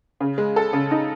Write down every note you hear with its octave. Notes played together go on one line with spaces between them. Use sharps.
C#3
G#3
A4
C#3
D#4